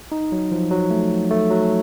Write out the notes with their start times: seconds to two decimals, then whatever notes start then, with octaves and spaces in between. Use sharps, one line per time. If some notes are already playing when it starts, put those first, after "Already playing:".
0.12 D#4
0.32 F#3
0.52 F3
0.71 F#3
0.91 A3
1.31 A3
1.51 F#3